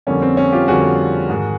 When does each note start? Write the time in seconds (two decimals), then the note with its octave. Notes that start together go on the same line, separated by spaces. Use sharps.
0.07 F2 D3 G3 A#3 C#4
0.22 C4
0.37 C#4
0.52 F4 G4
0.68 F2 D3 G3 A#3 F#4 G#4
1.29 G#2 D#3 G#3